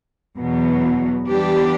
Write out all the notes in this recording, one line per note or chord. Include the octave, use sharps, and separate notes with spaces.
E2 B2 F#3 B3
E3 G3 B3 D4 G4